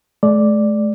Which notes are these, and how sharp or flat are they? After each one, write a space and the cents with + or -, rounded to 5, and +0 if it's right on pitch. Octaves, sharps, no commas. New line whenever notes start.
A3 -45 D5 +0